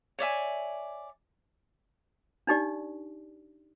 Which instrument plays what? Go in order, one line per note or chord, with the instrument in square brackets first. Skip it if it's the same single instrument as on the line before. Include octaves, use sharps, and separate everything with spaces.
[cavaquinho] C#5 D5 E5 G#5
[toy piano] D4 D#4 G4 D5